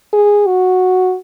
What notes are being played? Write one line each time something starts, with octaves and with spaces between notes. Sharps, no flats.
G#4
F#4